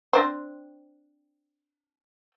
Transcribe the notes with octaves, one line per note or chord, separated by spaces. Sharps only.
C4 D4 C5